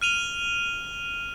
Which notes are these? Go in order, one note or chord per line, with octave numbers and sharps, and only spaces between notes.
F6 D#7 F7 G7